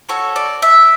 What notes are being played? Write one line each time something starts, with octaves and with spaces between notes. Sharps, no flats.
C#4 F#4 A4 C#5
D5
E5